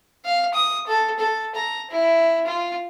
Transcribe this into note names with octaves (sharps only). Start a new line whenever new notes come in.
F5
D#6
A4
A4
A#5
E4
F4